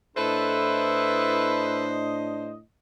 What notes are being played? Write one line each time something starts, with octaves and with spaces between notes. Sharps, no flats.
A2 D4 E4 A4 B4 C5 D#5